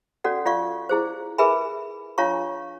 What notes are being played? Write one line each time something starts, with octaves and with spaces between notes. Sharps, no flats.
C#4 F#4 A4 D5 F#5
F4 D5 F5 C#6
E4 G#4 C5
G#4 A#4 B4 E5 G#5 B5
D4 F4 C#5 F5 A#5 C#6